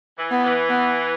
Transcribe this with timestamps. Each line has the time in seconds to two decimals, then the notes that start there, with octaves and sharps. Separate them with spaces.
0.18 E3
0.31 B3
0.44 E3
0.70 B3